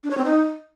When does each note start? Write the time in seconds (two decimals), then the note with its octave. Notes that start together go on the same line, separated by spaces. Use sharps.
0.04 D4
0.11 C#5
0.18 C4
0.25 D#4